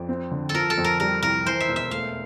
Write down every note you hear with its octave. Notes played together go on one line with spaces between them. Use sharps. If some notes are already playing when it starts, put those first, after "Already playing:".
Already playing: F2 D5
C4
D3
A4
F3 A#4
A4
F2
A#4
G3 A#4
C2 A#4
E3 C5
E5
E1
E5
A3 F5